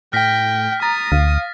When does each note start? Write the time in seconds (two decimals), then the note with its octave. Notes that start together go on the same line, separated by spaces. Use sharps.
0.13 A2 G5 F6 A#6 B6
0.82 A#5 D#6 A6
1.12 D2 F5